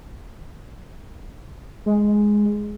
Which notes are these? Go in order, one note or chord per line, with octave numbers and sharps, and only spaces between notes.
G#3